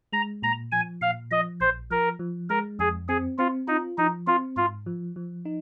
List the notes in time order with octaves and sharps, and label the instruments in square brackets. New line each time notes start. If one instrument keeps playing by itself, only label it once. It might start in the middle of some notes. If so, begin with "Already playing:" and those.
[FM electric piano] G#3 [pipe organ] A#5
[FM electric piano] A#2 [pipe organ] A#5
[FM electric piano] F3 [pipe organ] G#5
[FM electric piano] A#2 [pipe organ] F5
[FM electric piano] F3 [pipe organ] D#5
[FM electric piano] A#1 [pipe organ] C5
[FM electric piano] F3 [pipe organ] A#4
[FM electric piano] F3
[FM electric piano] G#3 [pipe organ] A#4
[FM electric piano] F2 [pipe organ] G#4
[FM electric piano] C4 [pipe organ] G#4
[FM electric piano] C4 [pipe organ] F4
[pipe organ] D#4 [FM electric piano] F4
[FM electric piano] F3 [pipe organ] D#4
[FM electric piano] C4 [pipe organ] F4
[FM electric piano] G#2 [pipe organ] F4
[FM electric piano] F3
F3
D#4